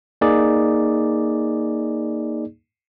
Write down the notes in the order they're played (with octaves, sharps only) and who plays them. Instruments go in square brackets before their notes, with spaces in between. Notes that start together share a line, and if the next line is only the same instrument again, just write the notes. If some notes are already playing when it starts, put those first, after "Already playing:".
[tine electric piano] A#3 D#4 G#4 D5